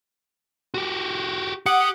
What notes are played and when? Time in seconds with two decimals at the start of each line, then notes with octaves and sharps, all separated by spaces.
0.74 F#4 G4
1.66 G4 F#5 D#6